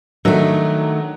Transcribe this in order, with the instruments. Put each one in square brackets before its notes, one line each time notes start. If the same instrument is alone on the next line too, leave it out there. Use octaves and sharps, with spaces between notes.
[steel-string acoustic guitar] D#3 A3 [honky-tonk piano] F#3 D4 F#4